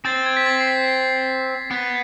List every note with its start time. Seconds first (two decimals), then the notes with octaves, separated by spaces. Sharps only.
0.05 C4 A6
0.16 A6
0.26 G#6
0.37 B6
0.46 A6
0.61 C7
0.67 B6
0.88 C7
1.71 B3